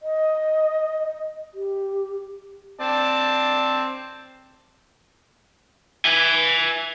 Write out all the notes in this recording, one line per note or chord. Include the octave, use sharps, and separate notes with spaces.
D#5
G4
C4 D5 A5
E5 G#5